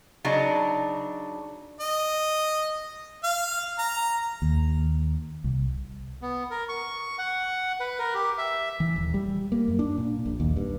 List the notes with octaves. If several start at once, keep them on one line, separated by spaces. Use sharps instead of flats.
C#3 F#3 D4 D#4
D#5
F5
A#5
D#2
C2
B3
A#4
C#6
F#5
B4
A#4
G4
E5
E3
D#1
G3
A#3
F#2
D4
A#2
A#1
D#2
G2